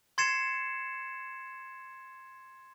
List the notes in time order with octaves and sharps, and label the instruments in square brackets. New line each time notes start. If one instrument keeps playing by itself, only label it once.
[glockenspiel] C6 G#6 A6 C7 C#7 E7